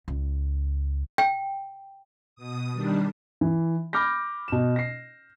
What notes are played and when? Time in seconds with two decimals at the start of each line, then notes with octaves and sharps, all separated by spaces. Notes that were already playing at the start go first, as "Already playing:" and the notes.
0.08 C#2
1.18 G5
2.35 B2 D#6
2.73 D#3 G3 D4
3.41 E3
3.93 B5 D6 F6 G6 A#6
4.48 B2 E7
4.76 A#6 C7